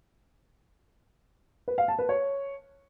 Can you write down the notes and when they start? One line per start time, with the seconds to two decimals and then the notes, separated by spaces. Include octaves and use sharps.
1.68 B4
1.78 F5
1.88 A5
1.99 B4
2.09 C#5